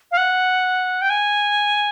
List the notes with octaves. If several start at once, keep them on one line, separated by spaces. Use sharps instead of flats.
F5
F#5
G5
G#5